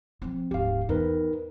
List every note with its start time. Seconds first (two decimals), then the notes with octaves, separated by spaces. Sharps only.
0.22 F3 C4
0.51 D1 G#2 G4 F5
0.89 E2 D#4 A#4 B4